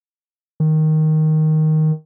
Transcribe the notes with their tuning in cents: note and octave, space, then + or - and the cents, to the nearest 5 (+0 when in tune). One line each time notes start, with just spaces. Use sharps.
D#3 +5